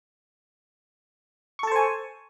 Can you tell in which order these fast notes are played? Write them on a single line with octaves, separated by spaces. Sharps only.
C#6 A4 A5 C5 G#5